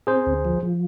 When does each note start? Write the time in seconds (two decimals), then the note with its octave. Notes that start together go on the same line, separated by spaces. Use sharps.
0.07 C4 G#4 C5
0.26 D2
0.45 F3
0.63 F3